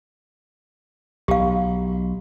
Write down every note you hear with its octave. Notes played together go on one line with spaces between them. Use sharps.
B1 G4 F5